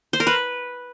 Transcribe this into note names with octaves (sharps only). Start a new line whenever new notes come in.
C5
A#4
B4